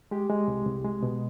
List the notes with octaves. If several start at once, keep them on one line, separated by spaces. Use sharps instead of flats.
G#3 G4
G#3
C2
C2
G#3
B2